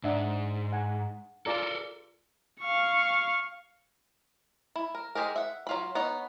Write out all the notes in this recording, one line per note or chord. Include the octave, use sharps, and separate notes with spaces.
G#2 D4 E5 F#5
F#5 G#5
F4 A4 A#4 D5 A#5
F5 C#6
E4
A#4
G#3 G4 G#4 A#4
E5 F#5
F#3 F4 B5
B3 D#4 C#5 F#5